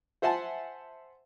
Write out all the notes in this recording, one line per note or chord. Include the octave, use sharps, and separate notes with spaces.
C5 E5 F#5 G#5 A5